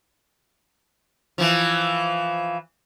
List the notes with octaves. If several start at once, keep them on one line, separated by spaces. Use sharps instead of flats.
E3 F3